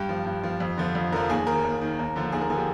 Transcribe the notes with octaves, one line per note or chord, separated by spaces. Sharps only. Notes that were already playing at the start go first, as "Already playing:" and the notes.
Already playing: G2 G4
F3
G2
F3
F2
D3 F3
F2
D3 F3 A#4
D#2 G#4
D#3 A#4
D#2
D#3
D#2
D3 F3
D#2 G#4
A#4
D3 F3 G#4
G4